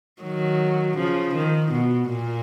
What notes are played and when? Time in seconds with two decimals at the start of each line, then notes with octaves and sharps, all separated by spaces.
0.22 D#3 F#3
0.97 C#3 F3
1.34 D#3
1.72 B2
2.10 A#2